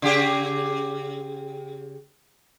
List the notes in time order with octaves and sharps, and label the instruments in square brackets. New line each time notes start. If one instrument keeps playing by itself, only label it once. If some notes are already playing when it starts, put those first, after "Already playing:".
[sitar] C#3 G4 G#4